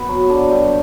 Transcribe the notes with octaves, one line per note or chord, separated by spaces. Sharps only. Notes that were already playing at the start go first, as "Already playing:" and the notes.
Already playing: B3
F#3
D3
G2